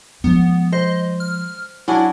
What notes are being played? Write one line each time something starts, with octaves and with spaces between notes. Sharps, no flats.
F3 G#3 B3
C5 D#5
F6
F#3 C#4 D4 E4